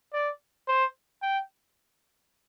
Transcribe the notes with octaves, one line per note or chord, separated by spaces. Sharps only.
D5
C5
G5